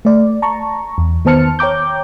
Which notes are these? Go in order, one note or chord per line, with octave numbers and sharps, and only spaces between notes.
A3 D5
A5 A#5 C#6
E2
D#3 B3 C5 A5 F6 C#7
C#5 G5 A#5 D6 G6